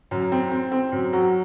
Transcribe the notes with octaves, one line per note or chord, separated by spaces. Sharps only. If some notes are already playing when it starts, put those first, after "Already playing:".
F#2
C4
C4
C4
F#2
F#3